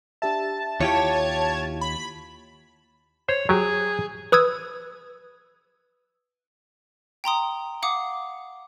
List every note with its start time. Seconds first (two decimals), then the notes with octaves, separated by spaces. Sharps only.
0.22 D4 G4 E5 A5
0.80 D#2 E4 F4 G4 C#5
1.81 B5
3.29 C5 C#5
3.49 F#3 G4 G#4
4.32 B4 D#6 E6 G#6
7.24 G5 A#5 C6 D#6
7.83 F5 F#5 D6 D#6